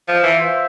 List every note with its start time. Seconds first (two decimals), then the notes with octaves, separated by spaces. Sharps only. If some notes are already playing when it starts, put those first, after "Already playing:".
0.08 F3
0.23 E3
0.38 F4 C5 E5